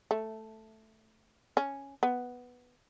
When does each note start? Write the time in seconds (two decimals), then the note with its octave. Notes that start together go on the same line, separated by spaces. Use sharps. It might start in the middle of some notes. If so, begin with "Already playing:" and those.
0.11 A3
1.57 C#4
2.03 B3